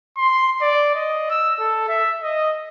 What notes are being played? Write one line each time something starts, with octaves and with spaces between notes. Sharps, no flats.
C6
D5
D#5
E6
A4
E5
D#5